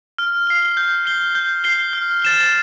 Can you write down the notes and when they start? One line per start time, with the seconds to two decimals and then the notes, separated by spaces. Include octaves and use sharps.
0.18 F6
0.47 C7 G7
0.77 G6
1.05 C7 G7
1.35 G6
1.64 C7 G7
1.93 F6
2.22 A6 E7 G7